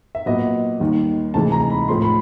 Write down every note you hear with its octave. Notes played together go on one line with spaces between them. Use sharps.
E5
A#2 F#3 B3 D#5
D#2 D#3 G3
D2 C3 E3 G#3 A5
A#5
B5
A2 F3 A3 C6
B5